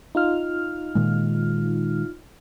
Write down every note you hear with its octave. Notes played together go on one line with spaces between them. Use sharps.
D#4 F4 F6
A#2 D#3 G#3